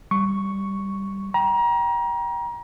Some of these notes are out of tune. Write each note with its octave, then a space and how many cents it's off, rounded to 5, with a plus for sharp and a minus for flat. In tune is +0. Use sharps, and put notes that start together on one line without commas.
G3 +0 C#6 +0
G5 +0 A#5 +30